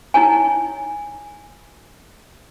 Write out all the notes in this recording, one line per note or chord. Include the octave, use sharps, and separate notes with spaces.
D#4 E4 C#5 G#5